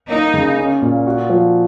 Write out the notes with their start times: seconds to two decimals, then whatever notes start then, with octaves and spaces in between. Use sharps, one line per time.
0.09 A#3 D#4
0.34 C#3
0.57 C#4
0.82 A#2
1.06 F#4
1.29 F3